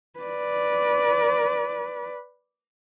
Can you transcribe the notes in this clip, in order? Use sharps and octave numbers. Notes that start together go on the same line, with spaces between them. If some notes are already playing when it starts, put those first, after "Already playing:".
B4 D5